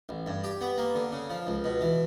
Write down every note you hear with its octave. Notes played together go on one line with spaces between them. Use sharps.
A1
G2
G4
B3
A#3
D3
C#3
F3
C#2
B2
E3